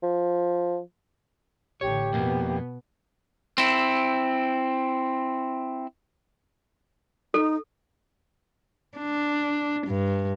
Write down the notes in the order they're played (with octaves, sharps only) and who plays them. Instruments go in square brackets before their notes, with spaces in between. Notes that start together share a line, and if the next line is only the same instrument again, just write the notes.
[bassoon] F3
[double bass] A1 D3 [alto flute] G4 [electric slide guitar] C#5
[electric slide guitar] F2 A#3 [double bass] B2 B3
[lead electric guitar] C4 E4
[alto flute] D#4 [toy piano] A4
[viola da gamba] D4
G2